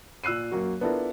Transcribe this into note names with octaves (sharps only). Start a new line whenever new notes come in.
A#2 E6 F#6 C7 D#7
F#2 A#3 F#4
B3 D4 E4 F4 A4 A#4